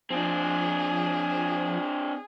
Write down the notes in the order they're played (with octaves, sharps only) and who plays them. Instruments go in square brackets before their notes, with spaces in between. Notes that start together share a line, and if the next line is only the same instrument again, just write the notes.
[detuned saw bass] F3 [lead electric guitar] C4 D4 [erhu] G#4